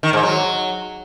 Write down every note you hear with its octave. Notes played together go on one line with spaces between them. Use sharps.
D#3
G#2
F#3